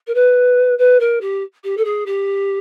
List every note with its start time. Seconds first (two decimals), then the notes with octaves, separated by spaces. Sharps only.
0.07 A#4
0.14 B4
0.78 B4
1.00 A#4
1.21 G4
1.64 G4
1.77 A4
1.85 G#4
2.06 G4